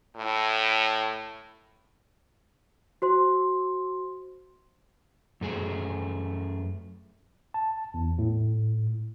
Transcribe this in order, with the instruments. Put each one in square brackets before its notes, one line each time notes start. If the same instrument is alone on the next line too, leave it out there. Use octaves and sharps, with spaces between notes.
[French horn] A2
[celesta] F#4 C5 C6
[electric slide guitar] F#2 A3 G#4
[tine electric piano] A5
E2
A2